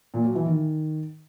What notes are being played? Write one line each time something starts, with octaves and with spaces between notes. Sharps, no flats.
A#2
F#3
E3
D#3